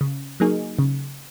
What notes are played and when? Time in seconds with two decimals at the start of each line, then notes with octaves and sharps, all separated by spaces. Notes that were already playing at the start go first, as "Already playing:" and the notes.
0.01 C#3
0.40 F#3 A#3 D#4 G#4
0.79 C#3